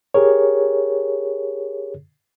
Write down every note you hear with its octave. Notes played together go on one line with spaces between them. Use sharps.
G4 G#4 A#4 C#5